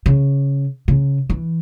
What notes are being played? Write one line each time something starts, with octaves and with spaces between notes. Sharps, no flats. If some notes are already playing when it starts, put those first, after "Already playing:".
C#3
C#3
E3